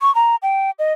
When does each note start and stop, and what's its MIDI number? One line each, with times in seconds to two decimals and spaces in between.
0.01 0.13 85
0.15 0.36 82
0.42 0.71 79
0.79 0.93 75